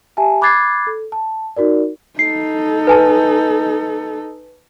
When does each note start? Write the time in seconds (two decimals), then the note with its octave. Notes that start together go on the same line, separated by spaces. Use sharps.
0.17 G4 E5 G#5 A5
0.41 B5 D6 F#6 G#6 A6 C7
0.87 A4
1.12 A5
1.56 D#4 F#4 A#4 D5
2.19 D#4 A4 C7
2.87 B4 G#5 A5